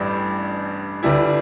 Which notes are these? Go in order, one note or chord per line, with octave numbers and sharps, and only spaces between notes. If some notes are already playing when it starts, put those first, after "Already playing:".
Already playing: A1 G2 G3
G1 G2 G3 E4